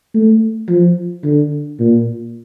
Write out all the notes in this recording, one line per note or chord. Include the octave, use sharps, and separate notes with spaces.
A3
F3
D3
A#2